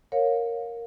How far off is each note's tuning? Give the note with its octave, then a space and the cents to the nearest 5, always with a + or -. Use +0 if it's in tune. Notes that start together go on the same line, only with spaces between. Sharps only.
A#4 -5 C#5 -5 F5 +30